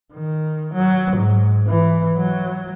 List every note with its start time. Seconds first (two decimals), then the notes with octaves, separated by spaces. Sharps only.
0.12 D#3
0.74 F#3
1.17 G#2
1.67 E3
2.17 F#3